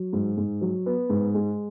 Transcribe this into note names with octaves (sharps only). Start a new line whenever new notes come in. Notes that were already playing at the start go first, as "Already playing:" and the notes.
Already playing: F#3
G#2
G#2
F#3
B3
G#2
G#3